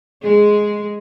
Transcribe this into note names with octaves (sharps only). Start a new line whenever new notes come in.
G#3 G#4